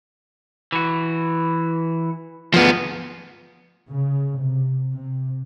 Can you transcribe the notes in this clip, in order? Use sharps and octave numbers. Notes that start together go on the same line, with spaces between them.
E3 F#4
D2 F3 B3
C#3
C3
C3